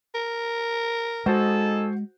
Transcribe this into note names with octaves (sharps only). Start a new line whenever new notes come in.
A#4
G#3 D#4 F#4 G#4 A4 C5